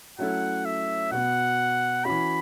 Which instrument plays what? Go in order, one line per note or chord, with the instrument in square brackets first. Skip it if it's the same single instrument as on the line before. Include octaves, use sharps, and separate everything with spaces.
[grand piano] F#3 A3 C#4 E4 A4 [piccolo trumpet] F#5
[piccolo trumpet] E5
[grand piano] B2 B3 F#4 [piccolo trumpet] F#5
[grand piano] E3 C#4 F#4 [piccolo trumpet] B5